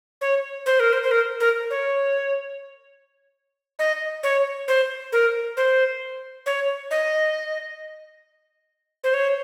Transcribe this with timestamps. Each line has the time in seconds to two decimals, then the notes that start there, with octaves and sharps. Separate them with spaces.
0.21 C#5
0.66 C5
0.80 A#4
0.93 C5
1.03 C5
1.11 A#4
1.40 A#4
1.70 C#5
3.79 D#5
4.23 C#5
4.68 C5
5.12 A#4
5.57 C5
6.46 C#5
6.91 D#5
9.04 C5
9.14 C#5